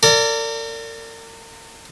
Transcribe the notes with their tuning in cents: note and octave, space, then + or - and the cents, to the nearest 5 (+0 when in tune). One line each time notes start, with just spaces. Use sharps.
A#4 -40 D5 -15